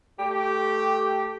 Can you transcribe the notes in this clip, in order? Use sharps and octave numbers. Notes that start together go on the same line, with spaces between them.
A3 G4